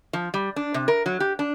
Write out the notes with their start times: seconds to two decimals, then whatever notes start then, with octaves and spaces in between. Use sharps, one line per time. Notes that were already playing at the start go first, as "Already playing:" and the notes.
0.13 F3
0.34 G3
0.56 D4
0.74 C3
0.88 A#4
1.06 F#3
1.20 G4
1.39 D4